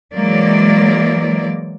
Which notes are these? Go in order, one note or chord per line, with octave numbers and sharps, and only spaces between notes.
E3 F#3 G#3 A#3 D5